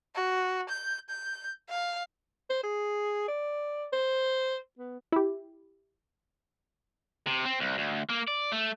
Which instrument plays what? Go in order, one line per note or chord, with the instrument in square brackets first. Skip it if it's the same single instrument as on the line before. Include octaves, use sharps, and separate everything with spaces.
[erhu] F#4
G6
G6
F5
[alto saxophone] C5
G#4
D5
C5
B3
[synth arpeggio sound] E4 G4
[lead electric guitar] C3
C4
C2
D2
A#3
D5
A3